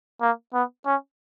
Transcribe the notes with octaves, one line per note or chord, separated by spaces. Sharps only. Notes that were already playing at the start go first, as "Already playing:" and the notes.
A#3
B3
C#4